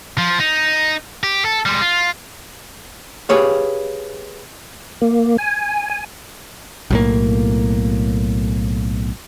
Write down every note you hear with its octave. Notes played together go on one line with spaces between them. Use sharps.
F3
D#4
G4
A4
G3 G#3
F4
G4 G#4 B4 C#5 F5
A#3
G#5
G#5
B1 A2 A#3